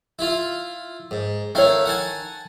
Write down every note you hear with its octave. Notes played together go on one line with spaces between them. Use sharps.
E4 F4
G#2
D#3 A3 E4 C#5 F5
F#5 G#5 A5